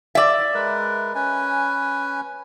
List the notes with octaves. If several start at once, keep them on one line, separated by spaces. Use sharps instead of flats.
D5 E5
G#3 A#4 B4
C#4 B4 G#5